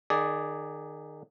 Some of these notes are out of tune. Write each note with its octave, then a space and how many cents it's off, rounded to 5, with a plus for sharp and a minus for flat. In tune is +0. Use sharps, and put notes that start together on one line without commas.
D#3 -25 G#4 +0 D5 +0